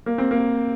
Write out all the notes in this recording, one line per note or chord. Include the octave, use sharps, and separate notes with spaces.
A#3
C4
A#3